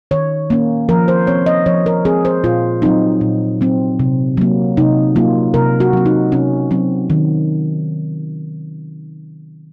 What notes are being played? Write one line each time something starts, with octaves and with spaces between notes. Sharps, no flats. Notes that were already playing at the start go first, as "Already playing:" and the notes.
D#3 C#5
A#3 C#4
F3 A#4
C5
C4 C#5
D#5
F3 C#5
A#4
C4 G#4
C5
A#2 F4
F#3 C4 D#4
A#2
F#3 C4
C3
F#3 A#3
C3 D#4
F#3 A#3 F4
C3 A#4
F#4
F#3 C4
D#4
C3 C#4
F#3 C4
D#3